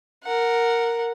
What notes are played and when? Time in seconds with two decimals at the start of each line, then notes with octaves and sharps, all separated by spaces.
0.24 A#4 F#5